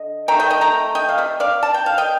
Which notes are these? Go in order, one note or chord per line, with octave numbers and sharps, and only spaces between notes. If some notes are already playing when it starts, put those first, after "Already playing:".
Already playing: D3 D#5
C3 D#3 A3 G5 A#5
D#5 G5
D#5 G5
G5 A#5
D#5 G5
F5
C3 G3
D5 F5
A5
G5
F5
D#5 G5